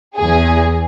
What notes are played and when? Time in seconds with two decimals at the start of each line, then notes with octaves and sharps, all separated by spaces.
0.17 E2 G#4